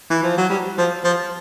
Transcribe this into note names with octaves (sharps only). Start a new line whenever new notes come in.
E3
F3
F#3
G3
F3
F3